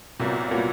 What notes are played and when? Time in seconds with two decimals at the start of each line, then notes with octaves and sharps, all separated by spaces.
0.20 C2 A#2 F#3 B3
0.51 A#2 F#3 B3